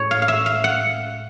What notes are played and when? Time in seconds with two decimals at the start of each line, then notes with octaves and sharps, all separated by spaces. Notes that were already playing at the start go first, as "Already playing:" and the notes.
Already playing: A2 G#3 C#5
0.11 F5
0.22 F5
0.28 E5
0.46 F5
0.64 F#5